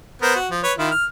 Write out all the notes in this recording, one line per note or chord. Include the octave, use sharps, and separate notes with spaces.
B3 A#4 C5
F#4
F3
B4 C#5
D#3 E4 F4
F6